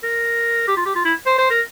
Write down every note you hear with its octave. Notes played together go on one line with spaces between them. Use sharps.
A#4
G4
F4
G4
F4
E4
C5
C5
A#4